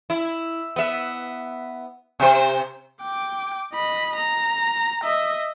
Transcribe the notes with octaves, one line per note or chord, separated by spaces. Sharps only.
E4
B3 E5
C3 C5
G5 D6
D#5 B5
A#5
D#5 E5